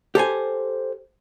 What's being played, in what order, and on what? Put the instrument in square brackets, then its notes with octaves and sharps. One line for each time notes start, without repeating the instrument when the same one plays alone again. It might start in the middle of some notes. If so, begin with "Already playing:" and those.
[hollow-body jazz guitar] G4 A4 C5 G#5